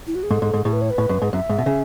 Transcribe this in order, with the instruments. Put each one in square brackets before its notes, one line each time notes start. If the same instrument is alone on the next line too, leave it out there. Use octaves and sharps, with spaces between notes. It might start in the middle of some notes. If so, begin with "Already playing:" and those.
[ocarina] E4
F#4
G#4
[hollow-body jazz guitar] G#2 [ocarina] A4
[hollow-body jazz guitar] G#2
G#2
[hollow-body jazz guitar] A2 [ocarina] G#4
[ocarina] B4
C#5
B4
[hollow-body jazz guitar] A2
F#2
G#2
[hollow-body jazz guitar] F#2 [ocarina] E5
[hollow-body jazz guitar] G#2
B2
C#3